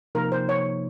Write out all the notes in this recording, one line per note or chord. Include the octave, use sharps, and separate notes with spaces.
C3 F3 A#3 D#4 A#4
C5
C#5